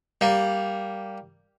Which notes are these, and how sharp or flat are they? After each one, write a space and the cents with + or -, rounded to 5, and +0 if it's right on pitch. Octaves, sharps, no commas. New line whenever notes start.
G3 +0 A#3 +0